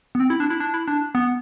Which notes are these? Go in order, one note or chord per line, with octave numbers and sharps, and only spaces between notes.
B3
C4
E4
D4
E4
D4
E4
D4
B3